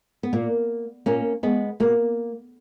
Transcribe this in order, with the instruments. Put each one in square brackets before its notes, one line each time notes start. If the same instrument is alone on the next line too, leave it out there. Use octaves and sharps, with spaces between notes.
[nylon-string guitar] B3
A#2 A#3
A#2 A#3 C#4
G#3 B3
B2 A#3